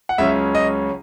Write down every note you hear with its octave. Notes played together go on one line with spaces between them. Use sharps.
F#5
C#2 C#3 F#3 C#4 E5
D#5